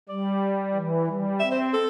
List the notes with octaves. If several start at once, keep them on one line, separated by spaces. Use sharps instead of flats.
G3 D5
E3
G3
C4 E5
C5
A4